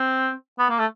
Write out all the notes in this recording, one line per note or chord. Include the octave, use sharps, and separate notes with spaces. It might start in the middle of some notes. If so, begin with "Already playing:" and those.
Already playing: C4
B3
A#3
A3